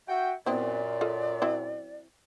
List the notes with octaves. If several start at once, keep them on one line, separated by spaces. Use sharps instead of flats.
F#4 E5 G5
F#2 A#2 B3 C4 E4 D5
F4 A4 D#5
F#3 C4 E4